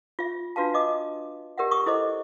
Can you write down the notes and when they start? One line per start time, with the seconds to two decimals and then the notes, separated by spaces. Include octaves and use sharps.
0.19 F4 E5
0.56 D4 F4 F#4 B4 F5 A5
0.74 D#5 D6 D#6
1.58 G4 A#4 D5 E5 F#5
1.71 C#6 D#6
1.86 E4 A4 C5 D#5 D6